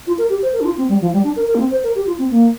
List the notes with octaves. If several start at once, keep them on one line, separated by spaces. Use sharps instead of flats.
F4
A#4
G4
C5
A#4
D4
F4
C4
G3
F3
G3
D4
A#4
A#4
A#3
C4
C5
A#4
G4
F4
C4
A#3